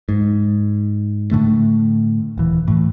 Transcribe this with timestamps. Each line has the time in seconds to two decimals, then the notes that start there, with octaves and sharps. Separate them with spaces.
0.09 G#2
1.31 A2 D3 A3
2.38 D#1 E3
2.68 A2 E3